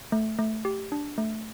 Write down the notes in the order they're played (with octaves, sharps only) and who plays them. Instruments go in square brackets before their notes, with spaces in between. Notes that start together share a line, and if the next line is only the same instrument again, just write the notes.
[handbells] A3
A3
G4
D4
A3